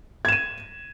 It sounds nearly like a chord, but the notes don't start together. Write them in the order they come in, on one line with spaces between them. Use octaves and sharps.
G#6 E7 D#7